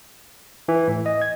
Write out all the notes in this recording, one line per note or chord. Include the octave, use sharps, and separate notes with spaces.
E3
A2
D#5
G#6